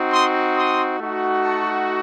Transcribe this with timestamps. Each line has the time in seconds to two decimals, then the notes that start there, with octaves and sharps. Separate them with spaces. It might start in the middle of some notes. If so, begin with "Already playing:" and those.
Already playing: C4 D#4 F#4
0.12 C6 D#6
0.57 C6 D#6
0.99 A3 D#4 F#4
1.43 A5 C#6